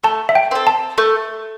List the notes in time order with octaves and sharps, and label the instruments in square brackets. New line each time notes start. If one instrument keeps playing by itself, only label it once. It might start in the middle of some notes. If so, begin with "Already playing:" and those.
[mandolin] A3 [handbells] A5
[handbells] E5
G5
[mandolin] C4 A4
[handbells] A5
[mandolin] A3